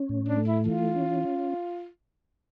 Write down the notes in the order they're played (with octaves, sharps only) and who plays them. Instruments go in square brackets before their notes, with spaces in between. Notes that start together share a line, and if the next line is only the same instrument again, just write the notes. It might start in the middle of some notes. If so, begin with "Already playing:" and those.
Already playing: [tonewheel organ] C#4
A2
[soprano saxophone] D4
[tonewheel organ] A3
[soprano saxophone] E4
[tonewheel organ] E3 [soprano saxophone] F4
[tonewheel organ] C#4